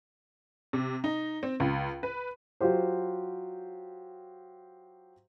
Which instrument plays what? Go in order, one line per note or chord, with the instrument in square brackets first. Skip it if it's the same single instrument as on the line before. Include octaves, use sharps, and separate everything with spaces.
[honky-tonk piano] C3
D#4
C4
C#2
B4
[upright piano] F#3 F4 G4 C5